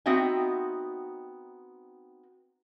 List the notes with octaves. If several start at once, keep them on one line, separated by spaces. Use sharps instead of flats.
B3 C4 D#4 F#4 E5 G5